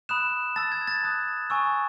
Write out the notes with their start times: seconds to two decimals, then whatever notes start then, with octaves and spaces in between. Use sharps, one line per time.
0.09 B5 D#6 F#6 E7
0.56 A5 E6 A6
0.72 G#6
0.87 A6
1.03 A5 D#6 F#6
1.50 G#5 C#6 E6